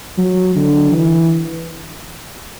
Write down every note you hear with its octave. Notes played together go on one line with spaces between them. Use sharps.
F#3
D3
E3